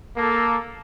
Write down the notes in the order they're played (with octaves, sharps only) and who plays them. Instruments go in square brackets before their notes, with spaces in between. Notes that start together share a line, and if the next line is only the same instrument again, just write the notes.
[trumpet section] A#3 A4